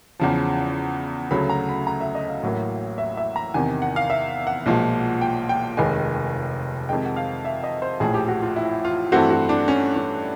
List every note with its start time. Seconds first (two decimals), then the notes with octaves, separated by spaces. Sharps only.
0.20 E2 C#3 F3
1.31 D2 C#3 F#3 A3 B5
1.50 A#5
1.69 B5
1.87 A#5
2.01 E5
2.15 D#5
2.29 F5
2.43 A1 A2 F#3 A#3
2.98 E5
3.17 E5
3.36 A#5
3.54 E2 C3 D#3 G#5
3.82 F#5
3.96 F5
4.10 E5
4.47 F#5
4.66 B1 A#2 F3 G#3
5.21 G5
5.49 G5
5.77 F1 D#2 D#3 G#3 G#5
6.89 F2 C3 D#3 G#3 G5
7.05 F#5
7.16 F5
7.45 E5
7.64 D#5
7.82 C5
8.00 A#1 A2 F3 G#4
8.14 G4
8.28 F#4
8.42 F4
8.56 E4
8.85 F4
9.12 G2 E3 A3 C4 F#4
9.31 F#4
9.49 D4
9.68 C#4
9.95 C#4